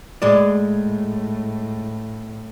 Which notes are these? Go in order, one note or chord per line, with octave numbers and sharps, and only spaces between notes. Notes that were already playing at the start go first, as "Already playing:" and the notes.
A2 G#3 D5